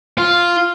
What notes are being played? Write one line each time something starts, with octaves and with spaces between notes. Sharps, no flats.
F4